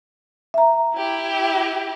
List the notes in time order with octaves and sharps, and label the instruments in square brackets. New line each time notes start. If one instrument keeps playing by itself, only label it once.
[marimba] E5 A#5
[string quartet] E4 G4